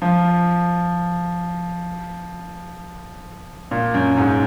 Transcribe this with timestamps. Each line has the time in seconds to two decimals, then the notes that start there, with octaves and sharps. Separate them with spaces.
0.02 F3
3.71 A#2
3.94 F#2
4.17 G#2